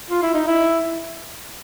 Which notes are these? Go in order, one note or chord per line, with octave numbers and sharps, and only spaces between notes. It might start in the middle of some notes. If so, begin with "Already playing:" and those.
F4
E4
D#4
E4